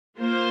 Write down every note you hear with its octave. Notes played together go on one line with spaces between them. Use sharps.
A#3 F4 C5